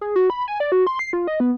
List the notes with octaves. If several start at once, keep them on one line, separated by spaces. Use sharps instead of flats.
G#4
F#4
B5
G#5
D5
F#4
C6
C7
F4
D#5
B3